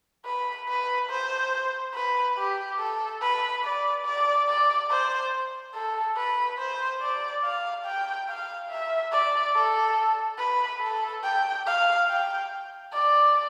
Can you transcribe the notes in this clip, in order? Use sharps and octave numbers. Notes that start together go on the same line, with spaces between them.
B4
B4
C5
B4
G4
A4
B4
D5
D5
D5
C5
A4
B4
C5
D5
F5
G5
F5
E5
D5
A4
B4
A4
G5
F5
G5
D5